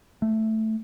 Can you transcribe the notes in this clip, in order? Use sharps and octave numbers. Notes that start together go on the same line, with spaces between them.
A3